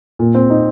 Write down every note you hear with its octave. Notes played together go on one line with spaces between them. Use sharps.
A#2
C4
D#4